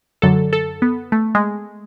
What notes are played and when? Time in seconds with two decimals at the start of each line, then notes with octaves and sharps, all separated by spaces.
0.22 F#2 D3 F#3 A4
0.53 A4
0.82 B3
1.12 A3
1.35 G#3